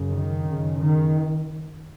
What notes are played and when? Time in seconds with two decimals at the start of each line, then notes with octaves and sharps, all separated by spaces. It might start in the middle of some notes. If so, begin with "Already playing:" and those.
Already playing: F#2 C#3
0.11 D#3
0.45 F#2 C#3
0.78 D#3